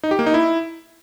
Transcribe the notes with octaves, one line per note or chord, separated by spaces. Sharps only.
D#4
G4
A#3
D#4
E4